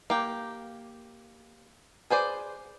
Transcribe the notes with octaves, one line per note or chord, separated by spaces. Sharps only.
A#3 G4
G#4 B4 C5 D5